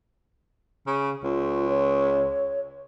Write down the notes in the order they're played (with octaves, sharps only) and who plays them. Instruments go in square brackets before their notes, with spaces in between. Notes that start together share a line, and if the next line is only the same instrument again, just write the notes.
[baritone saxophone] C#3
[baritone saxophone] C#2 [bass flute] F4
[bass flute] C#5